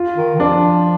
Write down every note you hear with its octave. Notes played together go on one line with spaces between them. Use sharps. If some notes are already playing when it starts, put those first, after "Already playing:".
Already playing: F4
D#3
D#3
F3 D4